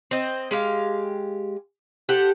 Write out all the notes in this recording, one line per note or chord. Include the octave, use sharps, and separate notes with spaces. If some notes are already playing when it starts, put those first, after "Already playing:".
C4 D#5
G#3 G4 F5
G4 A4 C5 F#5